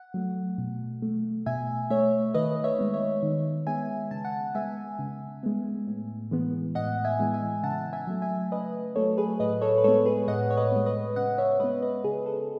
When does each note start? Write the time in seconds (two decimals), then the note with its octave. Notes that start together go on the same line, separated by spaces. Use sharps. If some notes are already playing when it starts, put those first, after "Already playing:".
Already playing: F#5
0.14 F#3 A3
0.58 B2
1.02 A3
1.46 B2 E5 G#5
1.90 A3 C#5 E5
2.35 D#3 B4 D#5
2.64 C#5 E5
2.79 G#3 B3
2.94 C#5 E5
3.23 D#3
3.67 G#3 B3 E5 G#5
4.11 C#3 A5
4.25 F#5 A5
4.55 G#3 B3 E5 G#5
4.99 C#3
5.43 G#3 B3
5.87 A2
6.31 E3 G#3 B3
6.75 A2 D#5 F#5
7.05 E5 G#5
7.19 E3 G#3 B3
7.34 E5 G#5
7.63 C#3 F#5 A5
7.93 E5 G#5
8.07 F#3 A3
8.22 E5 G#5
8.52 C#3 B4 D#5
8.96 F#3 A3 A4 C#5
9.18 G#4 B4
9.40 A2 B4 D#5
9.61 A4 C#5
9.78 B4
9.84 G#3 B3 A4 C#5
10.06 G#4 B4
10.28 A2 D#5 F#5
10.51 C#5
10.57 B4 D#5
10.72 G#3 B3
10.86 B4 D#5
11.16 C#3 D#5 F#5
11.38 C#5 E5
11.60 G#3 B3 B4 D#5
11.82 B4 D#5
12.04 C#3 G#4
12.26 A4